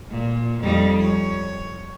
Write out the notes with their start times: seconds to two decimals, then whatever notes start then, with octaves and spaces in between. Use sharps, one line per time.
0.11 A#2
0.61 F2 G3 D#4
1.01 C#5